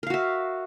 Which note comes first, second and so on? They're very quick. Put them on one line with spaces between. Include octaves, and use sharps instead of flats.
A#4 F5 F#4 E5